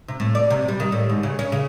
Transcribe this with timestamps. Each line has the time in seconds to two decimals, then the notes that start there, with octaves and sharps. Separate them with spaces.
0.08 C3
0.20 A2
0.35 D5
0.50 C3
0.68 G3
0.80 D#3
0.92 A2
1.09 G#2
1.23 C#3
1.39 C#4
1.52 C#3